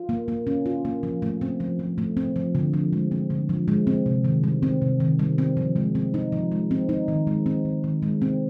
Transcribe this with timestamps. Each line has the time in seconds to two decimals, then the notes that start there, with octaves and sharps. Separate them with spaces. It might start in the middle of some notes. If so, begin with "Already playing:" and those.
Already playing: F4
0.09 A#3
0.28 A#3
0.47 C#4
0.66 F4
0.85 A#3
1.03 F3
1.22 A3
1.41 C4
1.60 F3
1.79 F3
1.98 A3
2.17 C4
2.36 F3
2.55 D3
2.73 F3
2.93 G#3
3.11 C4
3.30 D3
3.49 F3
3.68 G#3
3.87 C4
4.06 C3
4.25 D#3
4.44 G3
4.63 C4
4.82 C3
5.00 D#3
5.19 G3
5.38 C4
5.57 F3
5.76 G#3
5.95 C4
6.14 D#4
6.32 F3
6.52 G#3
6.71 C4
6.89 D#4
7.08 D#3
7.27 G#3
7.46 C4
7.65 D#3
7.84 D#3
8.02 G#3
8.22 C4